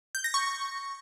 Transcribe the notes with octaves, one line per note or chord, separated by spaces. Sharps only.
G6
A#6
C#6